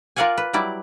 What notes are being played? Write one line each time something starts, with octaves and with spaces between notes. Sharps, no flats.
F4 A#4 D5 F5 F#5 G#5
B4
F#3 G3 E4 D5